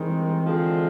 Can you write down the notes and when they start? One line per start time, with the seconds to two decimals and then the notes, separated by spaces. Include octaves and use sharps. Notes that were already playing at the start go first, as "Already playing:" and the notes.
Already playing: G2 D#3 E3 G#3 C4
0.45 D3 F3 G#3 C4